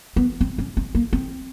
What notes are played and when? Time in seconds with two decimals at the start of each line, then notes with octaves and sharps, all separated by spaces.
0.16 B3
0.41 C4
0.58 C#4
0.77 C4
0.95 A#3
1.13 C4